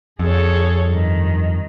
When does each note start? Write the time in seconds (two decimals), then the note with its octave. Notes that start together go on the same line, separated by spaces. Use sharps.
0.19 F2 G#4 A4 C#5
0.87 G2 D#3